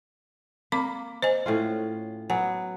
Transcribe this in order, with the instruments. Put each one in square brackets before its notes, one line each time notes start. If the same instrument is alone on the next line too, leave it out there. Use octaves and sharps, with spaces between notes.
[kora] A#3 [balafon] C4 B5 D6
[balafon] C5 D#5 G#5
[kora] A2 C#4 F4
[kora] F#3 B3 [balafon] G#5